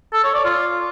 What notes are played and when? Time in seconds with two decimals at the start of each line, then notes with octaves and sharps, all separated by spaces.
0.14 A4
0.24 C#5
0.34 D5
0.45 F4